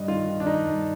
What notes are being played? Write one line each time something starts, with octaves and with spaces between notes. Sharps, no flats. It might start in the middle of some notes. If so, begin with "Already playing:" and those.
Already playing: G2 G3 D#5
D#3 F4
D#3
D4
D#3 D#4
G2